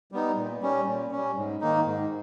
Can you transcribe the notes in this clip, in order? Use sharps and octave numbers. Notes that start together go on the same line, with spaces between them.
G3 B3 D#4
A#2
G3 C#4
A#2
G3 C#4
G#2
D#3 A#3 D#4
G#2